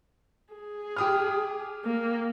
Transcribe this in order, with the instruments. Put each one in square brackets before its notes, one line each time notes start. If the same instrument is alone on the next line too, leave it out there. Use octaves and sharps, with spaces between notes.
[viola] G#4
[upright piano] G4 D#6 F6
[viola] A#3